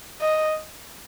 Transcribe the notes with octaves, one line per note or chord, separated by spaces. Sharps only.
D#5